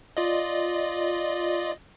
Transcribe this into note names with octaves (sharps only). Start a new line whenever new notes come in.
F4 D5 D#5